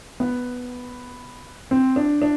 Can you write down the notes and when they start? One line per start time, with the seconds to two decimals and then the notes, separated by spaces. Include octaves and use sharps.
0.20 B3
1.71 C4
1.96 D4
2.22 D4